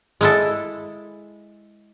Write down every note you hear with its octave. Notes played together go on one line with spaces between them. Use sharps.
G#3 E4 A4